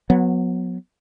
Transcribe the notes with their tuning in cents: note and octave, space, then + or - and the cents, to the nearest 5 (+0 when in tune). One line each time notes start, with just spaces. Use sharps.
F#3 -25 B3 +0